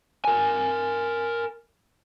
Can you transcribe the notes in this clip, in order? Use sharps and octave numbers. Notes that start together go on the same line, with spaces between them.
A#4 G#5